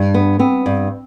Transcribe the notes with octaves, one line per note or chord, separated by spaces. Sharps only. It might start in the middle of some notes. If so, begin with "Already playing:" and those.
Already playing: G2 D4
B3
B3 C4
G2